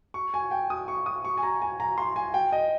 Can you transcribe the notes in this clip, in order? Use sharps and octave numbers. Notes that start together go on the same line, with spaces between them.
C#6
G#5
G5
D#6
C#6
D#6
C#6
G#5
A#5
G#5
A#5
C6
G#5
G5
D#5